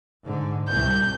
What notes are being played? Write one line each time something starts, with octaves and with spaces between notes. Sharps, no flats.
G#2 D3
C2 G6